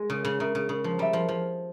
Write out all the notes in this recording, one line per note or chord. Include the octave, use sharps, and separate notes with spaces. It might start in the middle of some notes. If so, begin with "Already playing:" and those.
Already playing: G#3
C#3 G#4
C#3
C#3 E5 A#5
C#3
C#3 G#4
F3
G3 E5 A#5
F3
F3 G#4